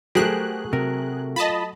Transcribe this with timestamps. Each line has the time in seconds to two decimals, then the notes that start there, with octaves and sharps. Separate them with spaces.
0.15 F#3 A3 G4 G#4 A#4 C5 F#6
0.73 C3 A#4
1.36 F4 D#5 A5 B5